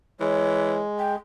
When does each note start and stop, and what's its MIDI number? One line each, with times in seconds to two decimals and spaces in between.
0.20 0.82 52
0.20 1.16 56
0.20 0.74 73
0.99 1.13 79